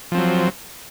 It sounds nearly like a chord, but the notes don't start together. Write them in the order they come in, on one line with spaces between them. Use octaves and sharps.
F3 C4 F#3